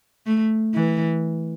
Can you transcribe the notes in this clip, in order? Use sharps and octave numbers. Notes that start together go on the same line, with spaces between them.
A3
E3